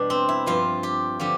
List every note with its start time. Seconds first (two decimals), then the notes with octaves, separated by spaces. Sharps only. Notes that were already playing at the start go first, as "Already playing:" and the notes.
Already playing: E2 B2 G3 D4
0.10 C4
0.29 E4
0.46 G2 F3 F4
0.83 G4
1.20 D3 F3 G4